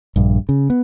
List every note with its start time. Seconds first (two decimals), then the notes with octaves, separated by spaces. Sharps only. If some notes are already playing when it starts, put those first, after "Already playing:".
0.16 A#1 G2
0.49 C#3
0.70 B3